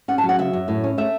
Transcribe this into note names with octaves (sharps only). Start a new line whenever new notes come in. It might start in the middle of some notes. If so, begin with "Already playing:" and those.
C#4 F#5
A5
F#3
F#5
C#3 E5
F#2
A2
C#4
A3 E5